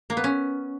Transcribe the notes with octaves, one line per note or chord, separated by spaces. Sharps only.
A#3
B3
C#4